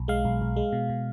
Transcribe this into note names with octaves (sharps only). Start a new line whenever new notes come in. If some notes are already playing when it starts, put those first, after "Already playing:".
Already playing: B1
G#3 F5
B1
B1
G#3
B2
B2